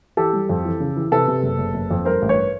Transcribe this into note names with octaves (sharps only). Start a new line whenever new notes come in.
E3 G4 A4
G3
F2
E3
C#3
E3
C3 A4 B4
C3
F#1
F#1
F#1
F2
G2 A#4 C5
A1
B4 C#5